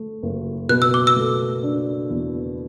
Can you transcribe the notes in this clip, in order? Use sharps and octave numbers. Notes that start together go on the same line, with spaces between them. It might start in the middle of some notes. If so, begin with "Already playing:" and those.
Already playing: A3
F#1
B2 F#6
E6
D6
E6
A3
D4
E2